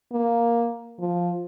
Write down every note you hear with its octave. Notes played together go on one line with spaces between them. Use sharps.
A#3
F3